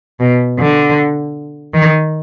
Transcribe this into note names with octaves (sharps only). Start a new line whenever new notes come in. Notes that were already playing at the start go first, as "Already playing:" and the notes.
B2
D3
D#3